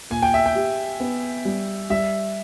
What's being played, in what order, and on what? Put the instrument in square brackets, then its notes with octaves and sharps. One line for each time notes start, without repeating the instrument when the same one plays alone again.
[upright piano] A#2 [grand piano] G#5
[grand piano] G5
E5
G5
[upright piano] G4
B3
G3
[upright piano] G3 [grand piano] E5